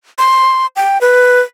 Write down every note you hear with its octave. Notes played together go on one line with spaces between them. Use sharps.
C6
G5
B4